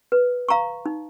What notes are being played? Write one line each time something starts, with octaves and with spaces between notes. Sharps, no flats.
B4
F5 A#5 C#6
D#4